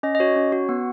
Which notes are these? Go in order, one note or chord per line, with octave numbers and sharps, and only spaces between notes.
C#4 D#5
D#5
F#4 C#5
C#4
F#4
B3 F#5